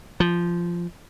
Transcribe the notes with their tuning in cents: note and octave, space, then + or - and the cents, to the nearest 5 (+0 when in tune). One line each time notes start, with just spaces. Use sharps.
F3 -10